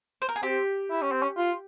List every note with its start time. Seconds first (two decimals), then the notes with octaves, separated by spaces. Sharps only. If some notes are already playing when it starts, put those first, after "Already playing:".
0.22 C5
0.29 A#4
0.36 G#4
0.43 C4 G4
0.90 E4
1.02 C#4
1.12 C4
1.22 C#4
1.37 F4